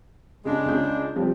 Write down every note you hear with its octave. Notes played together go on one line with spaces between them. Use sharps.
C#3 G#3 D4
C#2 C#3 G6
C3 F3 G3